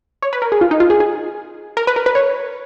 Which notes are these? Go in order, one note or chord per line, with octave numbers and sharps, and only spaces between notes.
C#5
B4
A#4
G#4
F4
D#4
F4
G#4
G#4
A#4
B4
A#4
B4
C#5